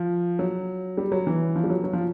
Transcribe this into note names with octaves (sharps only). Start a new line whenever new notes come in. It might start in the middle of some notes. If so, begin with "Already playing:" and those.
Already playing: F3
F#3
G3
F#3
E3
F3
G3
F#3
F#3
F3